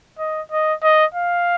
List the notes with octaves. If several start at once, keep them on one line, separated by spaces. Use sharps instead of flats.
D#5
D#5
D#5
F5